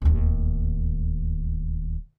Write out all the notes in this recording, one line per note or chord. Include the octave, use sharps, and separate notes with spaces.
D1 D#2